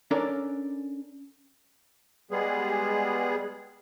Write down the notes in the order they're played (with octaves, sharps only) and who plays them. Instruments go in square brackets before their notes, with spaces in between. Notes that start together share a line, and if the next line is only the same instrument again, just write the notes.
[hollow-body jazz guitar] C#4 D4 A4 A#4 D5
[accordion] G3 G#3 B3 G#4